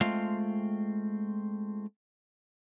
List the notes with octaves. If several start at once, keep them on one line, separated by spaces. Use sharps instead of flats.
G#3 A3 C4 F4 F5